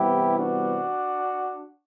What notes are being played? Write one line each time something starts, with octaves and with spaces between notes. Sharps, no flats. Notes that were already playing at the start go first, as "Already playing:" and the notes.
Already playing: C3 E3 G3 B3 E4 G4
D4 F#4